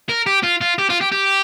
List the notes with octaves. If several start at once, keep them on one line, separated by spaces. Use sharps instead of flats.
A#4
G4
F4
F4
G4
F4
G4
G4